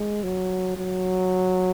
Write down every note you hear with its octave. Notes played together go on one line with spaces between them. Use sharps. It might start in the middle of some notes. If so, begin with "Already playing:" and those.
Already playing: G#3
F#3
F#3